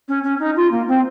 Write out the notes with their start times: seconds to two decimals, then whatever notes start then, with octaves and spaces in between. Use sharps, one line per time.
0.08 C#4
0.23 C#4
0.39 D#4
0.56 F4
0.71 A#3
0.88 C4